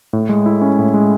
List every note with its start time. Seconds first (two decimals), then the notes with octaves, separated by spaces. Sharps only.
0.13 A2
0.29 G#3
0.46 E4
0.62 C#4
0.79 A2
0.94 G#3